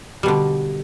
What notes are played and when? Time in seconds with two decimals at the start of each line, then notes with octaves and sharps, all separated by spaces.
0.23 G3
0.26 B2
0.28 D3